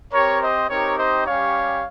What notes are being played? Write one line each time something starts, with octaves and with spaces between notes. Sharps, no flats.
C4 G4 A#4 C#5
C5 D#5
C4 D#4 G4 A#4 C#5
C5 D#5
G3 C#4 G4 C#5 F5